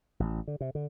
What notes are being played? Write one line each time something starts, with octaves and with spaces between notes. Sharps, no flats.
A1
D3
C3
D3